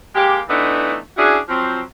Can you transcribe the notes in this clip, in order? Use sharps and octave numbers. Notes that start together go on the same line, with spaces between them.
G#3 A#3 G4
E3 A3 B3 D4 D#4
C#4 D4 E4 F#4 G#4
F3 F#3 C4